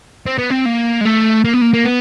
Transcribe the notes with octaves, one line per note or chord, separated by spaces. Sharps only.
C4
B3
C4
A#3
G#3
A3
A#3
B3
A#3
A#3
B3